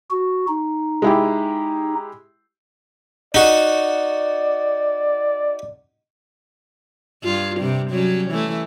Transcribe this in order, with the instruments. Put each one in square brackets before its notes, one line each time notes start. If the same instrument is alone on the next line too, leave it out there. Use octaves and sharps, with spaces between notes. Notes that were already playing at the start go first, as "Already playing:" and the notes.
[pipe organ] F#4
D#4
[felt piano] G#3 E4 G4
[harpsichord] D#4 F#4 [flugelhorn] D5
[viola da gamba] G2 F4
C3 G3
F#3 G3 C#4
E3 A3